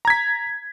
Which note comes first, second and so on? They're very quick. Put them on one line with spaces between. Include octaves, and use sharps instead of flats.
A#5 G#6 B6